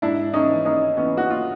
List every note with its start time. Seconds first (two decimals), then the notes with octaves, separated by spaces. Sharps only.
0.02 G#2 D4 E4
0.33 C#4 D#4
0.49 E3
0.65 C#4 D#4
0.97 E3 B3 C#4
1.17 F#4
1.30 F4